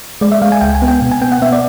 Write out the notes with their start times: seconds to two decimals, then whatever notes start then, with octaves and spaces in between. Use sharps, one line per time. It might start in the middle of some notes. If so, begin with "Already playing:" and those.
0.21 G#3 D5
0.32 E5
0.42 G#3 F5
0.52 G#5
0.61 C#2 G5
0.75 G#5
0.82 B3
0.88 G5
1.01 B2
1.12 G#5
1.21 B3 G5
1.32 F#5
1.42 B3 E5
1.53 D5